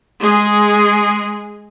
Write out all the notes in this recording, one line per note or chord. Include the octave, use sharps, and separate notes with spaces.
G#3 G#4